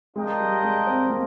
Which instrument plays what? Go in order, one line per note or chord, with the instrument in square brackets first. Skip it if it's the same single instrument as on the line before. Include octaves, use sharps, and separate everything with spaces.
[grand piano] G#3 [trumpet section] D4 F4 A#4 D#5 G5
[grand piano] G3
G#3
C4
A#3